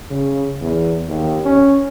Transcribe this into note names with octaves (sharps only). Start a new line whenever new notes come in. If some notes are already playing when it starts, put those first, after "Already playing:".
C#3
E2
D#2
C#4